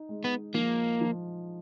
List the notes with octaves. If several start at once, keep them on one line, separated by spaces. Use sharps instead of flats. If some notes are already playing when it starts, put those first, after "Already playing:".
Already playing: D#4
G#3
B3
F3 A#3
F3